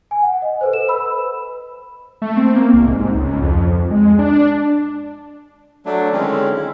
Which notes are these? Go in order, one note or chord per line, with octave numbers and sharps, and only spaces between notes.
G#5
F#5
D#5
A4 B4 C5
E7
B4 B5 E6
A3
C4
A#3
C2
G#2
C#2
F2
G#3
D4
F#3 A3 D4
D3 D#3 G#3 C4 C#4 E4
E4